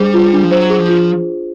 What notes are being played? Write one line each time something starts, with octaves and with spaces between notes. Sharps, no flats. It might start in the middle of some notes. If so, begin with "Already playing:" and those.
Already playing: G3 D4 G#4 C5
F4
D4
F3
F#3 C5
G#4
F3
F4